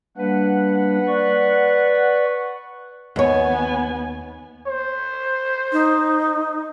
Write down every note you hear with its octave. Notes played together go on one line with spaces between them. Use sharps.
G3 A#3 D4 B4 F#5
D5 C#6
D#2 B3 C#5 G#5
C5
D#4